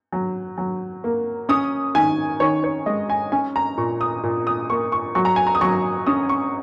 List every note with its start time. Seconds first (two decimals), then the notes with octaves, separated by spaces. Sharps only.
0.13 F#3
0.58 F#3
1.04 A#3
1.49 C#4 D#6
1.95 D#3 G#5
2.40 D#3 C#5
2.64 C#5
2.86 G#3 D#5
3.10 G#5
3.32 C#4 G#5
3.56 A#5
3.77 A#2 C#6
4.01 D#6
4.24 A#2
4.47 D#6
4.70 A#3 C#6
4.92 C#6
5.15 F#3 C#6
5.25 A#5
5.36 G#5
5.47 A#5
5.55 D#6
5.61 F#3 C#6
6.07 C#4 D#6
6.29 C#6